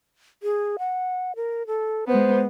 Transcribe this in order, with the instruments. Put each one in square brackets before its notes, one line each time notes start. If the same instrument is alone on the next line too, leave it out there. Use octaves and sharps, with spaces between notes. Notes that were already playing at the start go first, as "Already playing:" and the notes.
[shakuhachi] G#4
F#5
A#4
A4
[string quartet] G#3 B3 [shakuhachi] C5